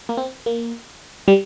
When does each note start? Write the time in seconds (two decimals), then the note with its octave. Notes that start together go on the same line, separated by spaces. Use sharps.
0.09 A#3
0.17 C4
0.46 A#3
1.28 G3